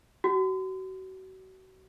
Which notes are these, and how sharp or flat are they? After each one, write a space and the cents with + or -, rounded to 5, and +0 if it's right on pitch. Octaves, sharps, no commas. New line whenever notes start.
F#4 +35